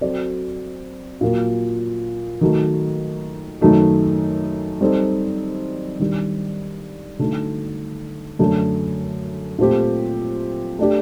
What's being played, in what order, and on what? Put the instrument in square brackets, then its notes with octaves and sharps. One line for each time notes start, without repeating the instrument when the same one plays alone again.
[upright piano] F#3 C4 F#4 A4 D5
A#2 F#3 A#3
D#3 F#3 A3
F#2 D#3 A3 D#4 F#4
G3 C4 D#4 A4
D#3 G3 D4
D3 F#3 A3 D#4
F#2 D3 A3 D4
A#2 A3 C4 G4
A3 D4 G4